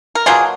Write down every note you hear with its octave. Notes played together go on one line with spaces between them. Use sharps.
A#4
B2 F#3 A#3 F4 G#4